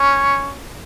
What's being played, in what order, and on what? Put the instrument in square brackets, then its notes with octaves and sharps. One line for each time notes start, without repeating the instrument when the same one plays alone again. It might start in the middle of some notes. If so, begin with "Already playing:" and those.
Already playing: [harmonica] C#4